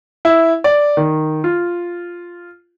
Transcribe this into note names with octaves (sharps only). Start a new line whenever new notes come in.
E4
D5
D#3
F4